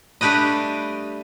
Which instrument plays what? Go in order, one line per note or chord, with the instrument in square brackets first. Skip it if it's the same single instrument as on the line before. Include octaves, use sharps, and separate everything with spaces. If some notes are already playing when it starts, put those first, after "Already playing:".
[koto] G3 A3 D4 G4 B4 D#5